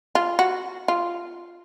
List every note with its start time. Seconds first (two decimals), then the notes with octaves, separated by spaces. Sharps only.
0.15 F4
0.39 F#4
0.88 F4